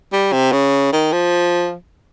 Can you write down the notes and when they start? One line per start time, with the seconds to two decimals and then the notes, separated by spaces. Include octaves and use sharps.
0.13 G3
0.33 C3
0.52 C#3
0.93 D#3
1.12 F3